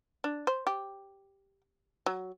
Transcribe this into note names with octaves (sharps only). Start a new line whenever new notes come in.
D4
C5
G4
F#3